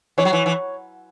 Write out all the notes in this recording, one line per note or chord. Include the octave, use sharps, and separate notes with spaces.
E3 C#5
F#3
E3
E3